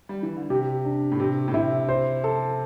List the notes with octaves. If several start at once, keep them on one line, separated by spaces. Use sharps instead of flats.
G3
E3
D3
C3 G4
D4
A2
C3 G4
A2
C3 E4
C5
A4